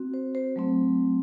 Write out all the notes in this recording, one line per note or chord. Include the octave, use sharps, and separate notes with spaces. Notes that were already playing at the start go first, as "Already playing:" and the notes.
Already playing: C4 F#4
C5
C5
F#3 A3 C4